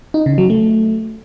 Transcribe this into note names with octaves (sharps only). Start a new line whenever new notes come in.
D#4
C#3
F#3
A3